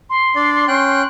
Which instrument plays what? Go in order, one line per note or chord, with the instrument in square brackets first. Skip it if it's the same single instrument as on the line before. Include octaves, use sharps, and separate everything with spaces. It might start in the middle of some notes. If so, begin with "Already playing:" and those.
[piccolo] C6
[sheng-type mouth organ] D4 D5
C#4 G5 F#6